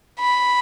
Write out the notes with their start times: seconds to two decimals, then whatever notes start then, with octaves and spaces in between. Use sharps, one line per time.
0.20 B5